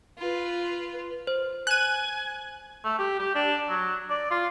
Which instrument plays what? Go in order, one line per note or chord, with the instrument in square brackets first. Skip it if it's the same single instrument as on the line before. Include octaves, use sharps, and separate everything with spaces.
[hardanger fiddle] F4 B4
[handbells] C5
[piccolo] G#5 [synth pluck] F#6 D#7
[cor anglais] A3
G4
G4
D4
F#3
D5
F4